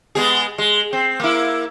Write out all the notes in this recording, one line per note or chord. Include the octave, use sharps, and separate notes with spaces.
G#3 B3 G#4
G#3
C4
A#3 E4